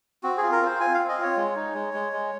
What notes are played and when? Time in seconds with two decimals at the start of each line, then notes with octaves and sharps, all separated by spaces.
0.23 C4 F#4
0.38 F4 G#4
0.52 A#4
0.61 C4 C5
0.80 F4 G#5
0.94 C4 F5
1.09 D#5
1.18 F4 C#5
1.37 G#3
1.56 D#4
1.75 G#3
1.94 G#3
2.13 G#3